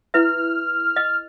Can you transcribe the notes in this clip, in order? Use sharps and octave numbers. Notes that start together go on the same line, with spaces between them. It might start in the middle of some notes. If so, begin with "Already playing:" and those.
E4 B4 E5 F6
D#5